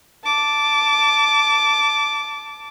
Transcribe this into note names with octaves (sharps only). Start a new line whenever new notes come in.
A5 D6